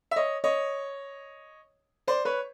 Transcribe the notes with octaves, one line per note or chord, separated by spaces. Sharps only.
E5
C#5 D#5
C#5 D#5
C5 D5
B4 C#5